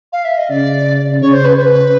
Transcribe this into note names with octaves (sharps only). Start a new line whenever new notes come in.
F5
E5
D#5
C#3 D5
C#3 C#5
C5
B4
C5
B4